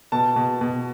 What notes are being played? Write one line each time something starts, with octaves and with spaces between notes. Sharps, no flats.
B2 A5
B2
B2